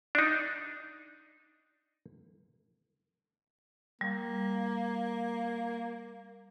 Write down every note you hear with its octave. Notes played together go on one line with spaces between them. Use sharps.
D4 D#4
G3 A#3